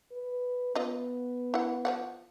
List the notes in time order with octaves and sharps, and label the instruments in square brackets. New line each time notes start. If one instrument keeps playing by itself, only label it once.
[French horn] B4
[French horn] B3 [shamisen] F4 D#5
[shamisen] E4 F#5
F3 D5 F#5